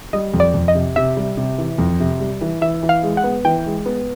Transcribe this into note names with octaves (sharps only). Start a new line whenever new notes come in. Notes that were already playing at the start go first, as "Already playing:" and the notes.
G3 D#5
F2
D5
F2
D#5
C3
C3 E5
G3
C3
E3
F2
C3
G3
E3
E3 E5
E3
F5
G#3
F#5
B3
E3 G5
G#3
B3